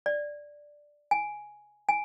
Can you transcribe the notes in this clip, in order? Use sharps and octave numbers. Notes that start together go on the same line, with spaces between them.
D5
G#5
G#5